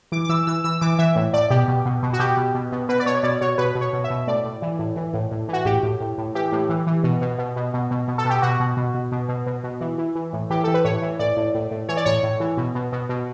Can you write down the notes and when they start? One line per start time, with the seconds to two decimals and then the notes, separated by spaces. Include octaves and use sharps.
0.12 E3 D6
0.24 D6
0.29 E3 E6
0.47 E3 E6
0.64 E3 E6
0.81 E3 D6
0.99 E3 E5
1.16 A2
1.33 A2 D5
1.50 B2 G4
1.68 B2
1.86 B2
2.03 B2
2.13 F#4
2.19 B2 G4
2.37 B2
2.55 B2
2.72 B2
2.89 B2 B4
3.00 D5
3.06 B2 C#5
3.23 B2 D5
3.41 B2 C#5
3.58 B2 B4
3.75 B2
3.81 C#5
3.93 B2
4.04 E5
4.10 B2
4.27 A2 D5
4.45 A2
4.62 E3
4.79 A2
4.96 E3
5.14 A2
5.31 A2
5.49 E3 F#4
5.65 A2 G4
5.83 A2
6.01 A2
6.18 A2
6.35 E3 G4
6.52 A2
6.69 E3
6.87 E3
7.04 B2
7.21 B2
7.39 B2
7.56 B2
7.74 B2
7.91 B2
8.08 B2
8.18 A4
8.25 B2 G4
8.42 B2 F#4
8.60 B2
8.77 B2
8.94 B2
9.12 B2
9.29 B2
9.46 B2
9.64 B2
9.81 E3
9.98 E3
10.15 E3
10.33 A2
10.50 E3 G4
10.64 E3 A4
10.74 B4
10.85 A2 C#5
11.02 E3
11.19 A2 D5
11.37 A2
11.54 A2
11.71 A2
11.89 E3 C#5
11.97 D5
12.05 A2 C#5
12.23 A2
12.40 E3
12.57 B2
12.75 B2
12.92 B2
13.09 B2